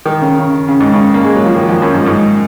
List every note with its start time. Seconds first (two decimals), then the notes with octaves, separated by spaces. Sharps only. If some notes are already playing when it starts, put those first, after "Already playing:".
0.06 D#3
0.22 C#3
0.39 C#3
0.68 C#3
0.80 G#2
0.93 C#3
1.14 A#3
1.24 G#3
1.36 F#3
1.46 F3
1.56 D#3
1.69 F3
1.82 F#2
1.94 G#2
2.06 G#2